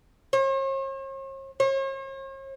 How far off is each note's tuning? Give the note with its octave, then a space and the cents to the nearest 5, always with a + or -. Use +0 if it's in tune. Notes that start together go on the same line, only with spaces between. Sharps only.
C#5 -45
C#5 -45